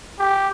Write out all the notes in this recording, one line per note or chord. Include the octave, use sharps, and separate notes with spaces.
G4